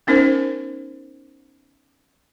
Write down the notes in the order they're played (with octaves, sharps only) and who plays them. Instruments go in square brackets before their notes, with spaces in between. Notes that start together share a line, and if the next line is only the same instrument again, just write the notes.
[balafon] B3 C#4 D#4 A#4 C5